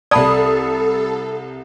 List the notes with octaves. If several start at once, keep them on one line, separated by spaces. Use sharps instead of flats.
C2 A4 D5 A5 B5 D#6